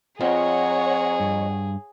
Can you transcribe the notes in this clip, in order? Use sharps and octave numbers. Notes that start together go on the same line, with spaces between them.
F2 C4 F4 G#4 C#5 F#5 A#5
G2